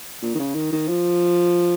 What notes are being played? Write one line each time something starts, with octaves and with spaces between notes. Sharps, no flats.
A#2
D#3
C#3
D#3
D#3
F3